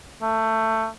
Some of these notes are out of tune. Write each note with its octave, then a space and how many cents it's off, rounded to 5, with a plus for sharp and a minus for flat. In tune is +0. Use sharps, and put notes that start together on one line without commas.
A3 +20